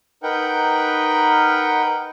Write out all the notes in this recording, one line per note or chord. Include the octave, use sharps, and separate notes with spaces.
D#4 A#4 B4 F#5 G5